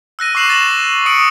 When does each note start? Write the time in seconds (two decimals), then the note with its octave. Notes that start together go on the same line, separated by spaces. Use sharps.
0.19 E6 F#6 A#6 D#7
0.35 C#6 D6 C7 E7 F#7
0.50 A6 A#6 E7 F#7
1.06 D6 D#6 C#7 D7 F#7